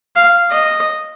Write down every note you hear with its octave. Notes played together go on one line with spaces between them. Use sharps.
F5
D#5